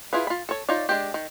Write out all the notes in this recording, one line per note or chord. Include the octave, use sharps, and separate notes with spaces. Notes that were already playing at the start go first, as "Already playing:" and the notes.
E4 F4 G#4 B4
F4 B5
A4 C#5
D#4 F4 C#5 D5
G#3 D4 G4
D#3